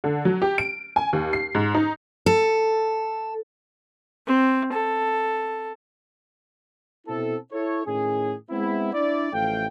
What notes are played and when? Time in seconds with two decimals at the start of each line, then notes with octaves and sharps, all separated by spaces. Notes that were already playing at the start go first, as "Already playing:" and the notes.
0.04 D3
0.25 F#3
0.42 G4
0.58 D7
0.96 G#5
1.13 D#2
1.33 C7
1.55 G#2
1.74 D#4
2.26 A4
4.27 C4
4.73 A4
7.07 B2 C4 E4 A4
7.52 E4 A4 C#5
7.86 A2 D#3 C#4 G#4
8.50 G#3 B3 C4 E4
8.93 D4 E4 D5
9.33 A1 F3 A3 F5 G5